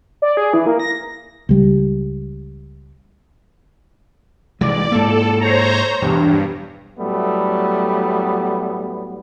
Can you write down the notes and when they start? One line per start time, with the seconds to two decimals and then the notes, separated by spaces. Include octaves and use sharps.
0.22 D5
0.37 G#4
0.54 E3
0.66 A#3
0.80 A#6
1.49 C#2 G3
4.61 C2 E3 G#3 D5
4.92 G#2 A#3 A4
5.40 C5 C#5 A#5
6.02 E1 E2 G2
6.99 A2 F#3 G3 A3 B3